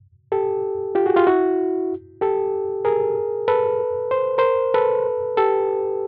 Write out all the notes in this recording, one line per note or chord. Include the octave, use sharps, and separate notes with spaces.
G4 A4
F4 G4
F#4 G#4
F4 G4
E4 F#4
G4 A4
G#4 A#4
A4 B4
C5
A#4 C5
A4 B4
G4 A4